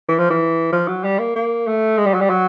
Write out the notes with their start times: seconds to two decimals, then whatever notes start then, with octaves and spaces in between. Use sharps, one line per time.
0.09 E3
0.19 F3
0.30 E3
0.72 F3
0.88 F#3
1.04 G3
1.19 A#3
1.36 A#3
1.67 A3
1.98 G#3
2.06 G3
2.14 F#3
2.21 G3
2.30 F#3